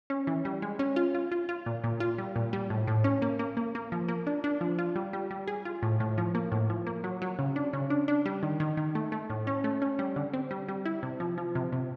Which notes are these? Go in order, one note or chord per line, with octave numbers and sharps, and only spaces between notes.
C#4
E3
G3
G#3
C#4
F4
F4
F4
F4
A#2
A#2
F4
G3
A#2
G3
A2
A2
C#4
A#3
A#3
A#3
A#3
F3
A#3
D4
D4
F3
F4
G3
G3
G3
G#4
F4
A2
A2
F3
A#3
A2
F3
A#3
F#3
F#3
C#3
D4
C#3
D4
D4
G3
D#3
D#3
D#3
A3
A3
A2
C#4
A3
C#4
G3
D3
C4
G3
G3
E4
C3
F3
F3
C3
C3